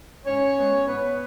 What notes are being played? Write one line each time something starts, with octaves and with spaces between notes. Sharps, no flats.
G#2 C#4 C#5
G#3 B3
G#2 B3 B4